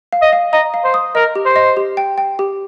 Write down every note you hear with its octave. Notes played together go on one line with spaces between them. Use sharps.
F5
D#5
F5
D#5 A#5
F5
C5
D#6
A#4 D#5
G4
C5
D#5
G4
G5
G5
G4